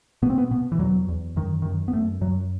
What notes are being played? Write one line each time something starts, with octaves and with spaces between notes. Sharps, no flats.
B2 B3
C4
B3
B2 B3
E3
E2 F#3
E2
F#2 D#3
F#2 D#3
B3
F#2 A3
F#2 F#3